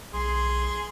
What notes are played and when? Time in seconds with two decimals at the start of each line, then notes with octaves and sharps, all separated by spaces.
0.13 B1 G#4 C6